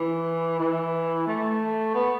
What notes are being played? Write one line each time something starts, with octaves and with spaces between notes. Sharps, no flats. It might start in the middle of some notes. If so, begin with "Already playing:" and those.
Already playing: E3
E3
A3
B3